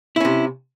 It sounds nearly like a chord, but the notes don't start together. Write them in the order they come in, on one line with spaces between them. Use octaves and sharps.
E4 C#4 C3